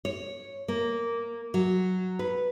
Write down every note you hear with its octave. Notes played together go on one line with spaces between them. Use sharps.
C#5
A#3
F#3
B4